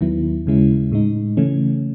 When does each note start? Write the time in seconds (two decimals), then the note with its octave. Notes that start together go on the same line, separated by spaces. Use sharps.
0.01 D#2 D#3 F#3 B3 E4
0.46 D#2 C#3 G#3 C#4 E4
0.91 A2 G#3 D#4
1.37 C#3 E3 A3 C#4